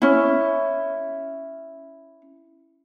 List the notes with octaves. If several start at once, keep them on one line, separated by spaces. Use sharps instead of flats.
C#4 E4